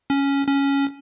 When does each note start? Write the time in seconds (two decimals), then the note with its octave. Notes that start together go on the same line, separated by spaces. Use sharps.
0.10 C#4
0.47 C#4